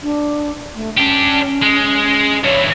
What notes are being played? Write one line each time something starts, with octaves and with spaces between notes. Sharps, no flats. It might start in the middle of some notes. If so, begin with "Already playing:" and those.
D4
A3
C#4 D4 G4
G#3
G2 E3 C#5